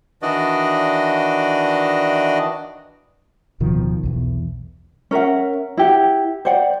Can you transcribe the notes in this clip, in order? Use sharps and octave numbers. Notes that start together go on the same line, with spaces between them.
D#3 E3 D4 F#4 D5 D#5
D1 B2 D#3 F3
B1 E2 B2
C#4 A#4 E5 F#5
E4 G4 F#5
C5 D5 F#5 G5